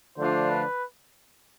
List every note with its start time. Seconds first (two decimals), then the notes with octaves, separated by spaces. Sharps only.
0.18 D3 F3 A3 D4 F4 C5
0.50 B4